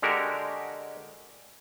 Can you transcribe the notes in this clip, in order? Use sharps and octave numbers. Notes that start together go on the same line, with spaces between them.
D3 G#3 F#4 G4 A#4